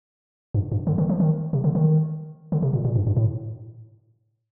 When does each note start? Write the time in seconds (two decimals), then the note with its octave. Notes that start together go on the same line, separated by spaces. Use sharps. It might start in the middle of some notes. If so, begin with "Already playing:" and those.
0.54 G2
0.72 G2
0.87 D3
0.98 D#3
1.09 F3
1.20 D#3
1.53 C3
1.64 D3
1.75 D#3
2.52 D3
2.62 C3
2.73 A#2
2.85 A#2
2.96 G2
3.07 G2
3.17 A2